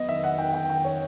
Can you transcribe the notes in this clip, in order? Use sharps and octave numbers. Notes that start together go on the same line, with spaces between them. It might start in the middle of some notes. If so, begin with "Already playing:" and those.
Already playing: F#3 B3 D#5
D#3 E5
F#5
D#3 G5
F#5
G5
D#3 G5
C#5